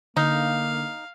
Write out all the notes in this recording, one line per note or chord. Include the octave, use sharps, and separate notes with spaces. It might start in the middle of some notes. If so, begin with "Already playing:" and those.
D3 A#3 D#4 F5